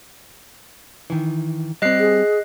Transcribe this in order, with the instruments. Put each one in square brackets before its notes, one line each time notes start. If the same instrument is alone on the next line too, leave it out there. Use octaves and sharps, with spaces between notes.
[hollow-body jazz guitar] D#3 E3
[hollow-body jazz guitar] G3 C4 [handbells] D#5 F#6 C7
[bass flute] G#4